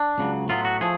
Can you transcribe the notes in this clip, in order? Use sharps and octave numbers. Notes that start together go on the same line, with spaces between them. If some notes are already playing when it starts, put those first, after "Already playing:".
Already playing: D4
C#2 C#3 F#3
A2 F#3 B3 F4
F#4
F3 A3 G#4